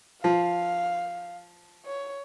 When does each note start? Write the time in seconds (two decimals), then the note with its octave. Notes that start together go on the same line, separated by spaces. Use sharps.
0.24 F3 F5
1.86 C#5